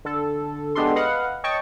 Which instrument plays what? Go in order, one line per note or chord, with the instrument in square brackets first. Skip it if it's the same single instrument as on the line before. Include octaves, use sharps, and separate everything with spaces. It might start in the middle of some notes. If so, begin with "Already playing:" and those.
[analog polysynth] D3 A4
G#3 B3 D4 G4 A4 C6
B4 D#5 F5 F#5
C#5 D#5 G5 A5 C#6